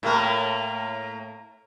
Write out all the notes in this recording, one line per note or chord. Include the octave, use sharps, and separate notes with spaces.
A2 A#3 A#4